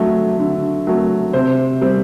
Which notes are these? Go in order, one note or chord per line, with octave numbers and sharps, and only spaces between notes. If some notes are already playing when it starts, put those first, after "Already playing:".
Already playing: D3 F#3 A3
D3
F#3 A3
C3 C5
G3 C4